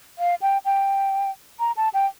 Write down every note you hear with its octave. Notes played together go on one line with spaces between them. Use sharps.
F5
G5
G5
A#5
A5
G5